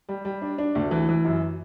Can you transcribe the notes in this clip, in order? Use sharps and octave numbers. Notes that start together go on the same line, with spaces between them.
G3
G3
D4
D4
D2
E3
E3
F#2